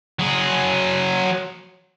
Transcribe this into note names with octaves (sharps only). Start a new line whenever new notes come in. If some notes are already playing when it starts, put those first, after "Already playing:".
F#3 G#4